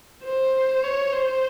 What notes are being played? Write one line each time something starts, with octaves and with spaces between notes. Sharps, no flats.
C5
C#5
C5